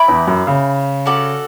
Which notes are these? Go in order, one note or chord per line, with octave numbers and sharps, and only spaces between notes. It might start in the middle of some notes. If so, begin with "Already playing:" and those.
Already playing: E4 B4 D5 G5
E2
F#2
C#3
C#4 F#4 A4 D5